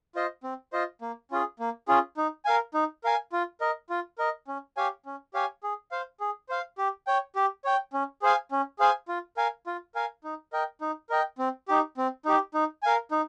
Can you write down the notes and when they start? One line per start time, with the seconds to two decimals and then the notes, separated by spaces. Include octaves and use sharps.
0.15 F4 C5 D#5
0.43 C4
0.73 F4 C5 D#5
1.02 A#3
1.31 C#4 F4 G#4
1.59 A#3
1.88 C#4 F4 G#4
2.17 D#4
2.45 A#4 F5 G#5
2.74 D#4
3.04 A#4 F5 G#5
3.32 F4
3.61 A#4 D#5
3.90 F4
4.18 A#4 D#5
4.48 C#4
4.77 G4 C#5 F5 G#5
5.06 C#4
5.34 G4 C#5 F5 G#5
5.63 G#4
5.91 C5 F5
6.20 G#4
6.49 C5 F5
6.78 G4
7.07 C#5 G5
7.36 G4
7.65 C#5 G5
7.93 C#4
8.22 G#4 C5 F5 G#5
8.51 C#4
8.79 G#4 C5 F5 G#5
9.08 F4
9.37 A#4 F5 G#5
9.67 F4
9.95 A#4 F5 G#5
10.24 D#4
10.53 A#4 D#5 G5
10.81 D#4
11.10 A#4 D#5 G5
11.38 C4
11.68 D#4 G4
11.97 C4
12.25 D#4 G4
12.54 D#4
12.83 A#4 F5 G#5
13.11 D#4